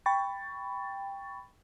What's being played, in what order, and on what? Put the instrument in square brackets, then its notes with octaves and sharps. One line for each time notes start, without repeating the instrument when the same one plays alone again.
[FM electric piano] G5 B5 C#6 A6